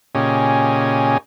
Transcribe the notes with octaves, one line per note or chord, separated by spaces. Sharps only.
A#2 C#3 C#4 G4 D#5 G#5